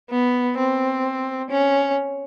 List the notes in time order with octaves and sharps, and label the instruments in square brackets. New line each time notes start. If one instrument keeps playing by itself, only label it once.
[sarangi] B3
C4
C#4